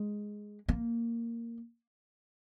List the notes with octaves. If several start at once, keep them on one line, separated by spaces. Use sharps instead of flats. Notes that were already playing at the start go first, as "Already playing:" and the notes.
Already playing: G#3
A#3